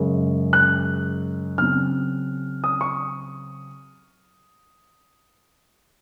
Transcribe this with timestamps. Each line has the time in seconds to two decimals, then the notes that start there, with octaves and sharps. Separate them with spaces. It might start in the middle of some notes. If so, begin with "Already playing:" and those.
Already playing: F#2 C#3 G#3
0.53 F#6
1.58 C#3 F#3 C4 F6
2.64 D#6
2.81 C#6